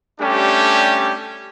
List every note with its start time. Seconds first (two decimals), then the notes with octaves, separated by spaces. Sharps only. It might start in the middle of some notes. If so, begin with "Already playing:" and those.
0.20 G3 A3 C#4 D4 G4